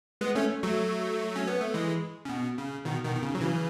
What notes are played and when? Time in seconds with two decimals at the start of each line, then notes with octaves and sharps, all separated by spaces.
0.21 G#3 B3
0.35 A3 C#4
0.63 F#3 A3
1.36 C#4
1.47 B3
1.61 A3
1.74 E3 G#3
2.25 C#3
2.29 B2
2.58 C#3
2.85 B2 D#3
3.04 B2 D#3
3.16 D#3
3.22 C#3
3.35 F#3
3.41 C#3 E3